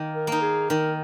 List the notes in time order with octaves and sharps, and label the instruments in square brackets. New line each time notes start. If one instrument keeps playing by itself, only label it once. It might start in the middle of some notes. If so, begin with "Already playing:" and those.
Already playing: [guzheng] D#3 A#3 D#4
[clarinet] A#4
[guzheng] A#3 D#4
[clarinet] G#4
[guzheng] D#3 [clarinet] A#4